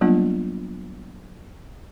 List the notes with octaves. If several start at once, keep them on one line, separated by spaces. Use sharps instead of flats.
F#3 G3 A#3 B3 D4 F4